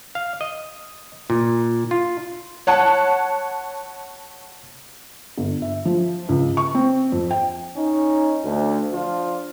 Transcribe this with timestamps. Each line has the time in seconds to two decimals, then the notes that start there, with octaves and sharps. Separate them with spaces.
0.15 F5
0.41 D#5
1.30 A#2
1.91 F4
2.67 C#5 F#5 A5
5.37 G1
5.62 E5
5.85 F3
6.29 C#2
6.57 C#6
6.75 C4
7.12 F2
7.31 G5
7.77 C#4 D#4
8.45 D2
8.93 F3 D4 F4